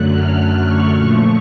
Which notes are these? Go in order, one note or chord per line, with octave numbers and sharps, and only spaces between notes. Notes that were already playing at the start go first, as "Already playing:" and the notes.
Already playing: F#2 D3 F#3 A3 F#6
F6
C#6
A#2 F3 A3